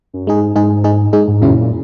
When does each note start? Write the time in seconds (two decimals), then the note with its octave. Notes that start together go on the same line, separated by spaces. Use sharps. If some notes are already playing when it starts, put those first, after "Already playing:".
0.13 F#2
0.27 G#2 G#3 D#4 G#4
0.56 G#2 G#3 D#4 G#4
0.84 G#3 D#4 G#4
1.13 G#3 D#4 G#4
1.28 G#2
1.41 F#2 A#2 C#3 F#3 C#4 E4
1.60 A#2